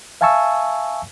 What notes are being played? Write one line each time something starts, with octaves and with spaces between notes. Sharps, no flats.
E5 F5 G#5 A5 C#6 E6